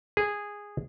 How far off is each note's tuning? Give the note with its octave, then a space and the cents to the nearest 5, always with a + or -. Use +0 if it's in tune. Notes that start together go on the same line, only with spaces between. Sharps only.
G#4 -10